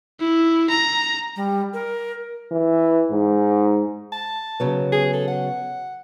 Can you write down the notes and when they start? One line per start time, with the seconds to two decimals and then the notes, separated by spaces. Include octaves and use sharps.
0.20 E4
0.70 A#5
1.36 G3
1.74 A#4
2.51 E3
3.11 G#2
4.12 A5
4.60 C#3 F#3 B3
4.92 G#4
5.13 A4
5.28 F#5